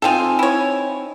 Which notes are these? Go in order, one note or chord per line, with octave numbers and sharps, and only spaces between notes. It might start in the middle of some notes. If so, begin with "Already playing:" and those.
C4 D#4 F4 A4 G#5
E4 C#5